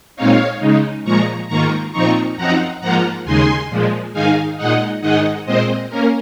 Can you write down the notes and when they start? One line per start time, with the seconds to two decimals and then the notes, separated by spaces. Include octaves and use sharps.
0.16 A#2 G#3 C4 D#4 C#5 F5
0.61 C#3 G#3 D#4
1.04 A#2 F3 G#3 A#5 C#6
1.48 G#2 D#3 A#3 F4 A#5 C#6
1.93 A#2 F3 C4 D#4 A#5 C#6
2.37 F#2 F3 C4 D#4 F#5 A#5
2.81 G#2 F3 A#3 F4 F#5 A#5
3.25 D#2 C#3 G#3 D#4 G#5 C6
3.69 A#2 F3 G#3
4.13 G#2 D#3 G#3 D#4 F5 G#5
4.57 A#2 G#3 D#4 D#5 F#5
5.01 G#2 D#3 G#3 D#4 D#5 F#5
5.46 A#2 G#3 C4 C5 D#5
5.90 A#3 C#4 A#4